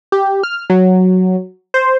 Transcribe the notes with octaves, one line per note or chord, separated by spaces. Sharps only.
G4
F6
F#3
C5